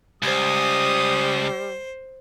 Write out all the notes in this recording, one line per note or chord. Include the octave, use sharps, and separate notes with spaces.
C#2 G3 C5 D#6